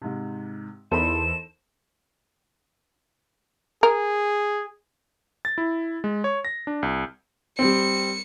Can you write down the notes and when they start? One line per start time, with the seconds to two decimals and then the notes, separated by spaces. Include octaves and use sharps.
0.02 G#2 C3
0.91 E2 D#4 A4 A#4 C5 B5 E7
3.83 G#4 A#4
5.45 A6
5.58 E4
6.04 G#3
6.24 C#5
6.45 A#6
6.67 D4
6.82 C2
7.59 G3 C4 C#7